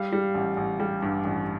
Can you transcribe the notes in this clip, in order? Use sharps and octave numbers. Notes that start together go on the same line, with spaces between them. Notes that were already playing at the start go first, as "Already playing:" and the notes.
Already playing: G3 F5
G3
A1
A1
G3
G2
A1